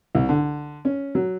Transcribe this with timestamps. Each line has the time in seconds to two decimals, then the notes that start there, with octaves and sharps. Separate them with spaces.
0.15 C2
0.29 D3
0.85 C#4
1.15 F#3